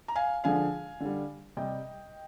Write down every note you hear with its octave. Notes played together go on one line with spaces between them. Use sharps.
A#5
F5 G#5
D3 F3 G#3 F5 G#5
D3 G3
C3 G3 D#5 G5